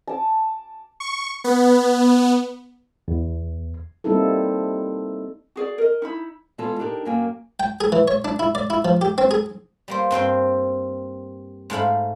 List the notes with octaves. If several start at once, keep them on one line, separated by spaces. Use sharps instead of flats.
A5 D6
C#6
B3
E2
G3 A#3 C4 D#4 E4 A4
F#4 G#4 D5
A#4 D#5
D#4 E4 B5
B2 E3 G#3 F4 G#4 A4
D4 D#4 G4 A#4
F#2 F#3 A#3 A#4 G5 G#5
G5
G#4
E3
C#5
D4
E4
D5
E4
F3
G4
C4
G#4
G3 A#3 C5
G2 C4 C5 G5
G#2 A3 F5 B5